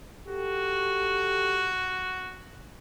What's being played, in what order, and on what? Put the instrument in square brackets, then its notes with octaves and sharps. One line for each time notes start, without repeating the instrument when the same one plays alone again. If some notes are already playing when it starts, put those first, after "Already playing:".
[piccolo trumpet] F#4 [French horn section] G4 A4